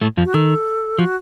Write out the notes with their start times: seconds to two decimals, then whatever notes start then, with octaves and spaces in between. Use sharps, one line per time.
0.01 A2 A3
0.17 F2 F3
0.25 F#4
0.34 D#3 A4
0.98 F3 F#4